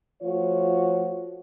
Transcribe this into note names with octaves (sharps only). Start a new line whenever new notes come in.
F3 A3 F4 F#4 C#5